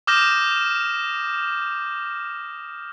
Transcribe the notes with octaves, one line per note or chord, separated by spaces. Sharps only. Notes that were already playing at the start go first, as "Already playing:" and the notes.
D6 D#6 F6 G6 A#6 E7